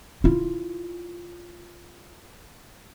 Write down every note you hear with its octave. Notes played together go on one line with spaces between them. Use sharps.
E4 F4